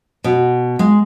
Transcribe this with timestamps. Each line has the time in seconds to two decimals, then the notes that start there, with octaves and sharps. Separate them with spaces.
0.24 B2
0.79 G#3